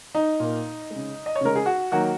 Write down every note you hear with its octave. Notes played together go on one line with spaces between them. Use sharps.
D#4
A#2 A#3
C#3 G#3
D#5
C#5
C#3 G#3 A#4
G#4
F#4
D#3 F#3 A#3 F#4